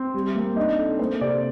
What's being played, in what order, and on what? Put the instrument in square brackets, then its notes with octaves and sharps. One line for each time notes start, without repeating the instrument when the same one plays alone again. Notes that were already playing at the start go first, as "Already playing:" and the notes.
Already playing: [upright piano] C4
[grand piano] G3
A#3
[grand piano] D4 [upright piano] D#4
[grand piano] A4
[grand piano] A#3 [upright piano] C5
[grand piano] C3 [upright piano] D5